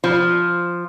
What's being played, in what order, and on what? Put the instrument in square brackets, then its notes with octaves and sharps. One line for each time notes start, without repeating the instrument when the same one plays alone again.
[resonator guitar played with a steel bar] F3